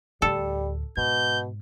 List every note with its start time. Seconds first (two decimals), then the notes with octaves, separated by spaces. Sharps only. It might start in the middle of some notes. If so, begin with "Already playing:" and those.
0.22 D2 A2 G3 A4
0.97 G#2 B2 G6